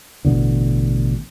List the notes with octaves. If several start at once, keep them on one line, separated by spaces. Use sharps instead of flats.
A1 B2 D3